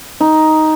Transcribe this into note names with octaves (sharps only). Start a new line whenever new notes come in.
D#4